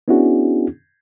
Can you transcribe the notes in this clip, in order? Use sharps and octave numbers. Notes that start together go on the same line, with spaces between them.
B3 C#4 D4 E4 F#4 G#4